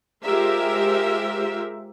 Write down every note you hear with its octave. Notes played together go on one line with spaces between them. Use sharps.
G#3 F4 G4 A#4 C5 E5